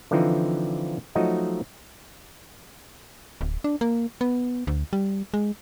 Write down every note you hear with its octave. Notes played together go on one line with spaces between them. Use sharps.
D3 E3 F3 C4 D#4
F3 F#3 A3 D#4 F#4 D#5
D1
D4
A#3
B3
D2
G3
G#3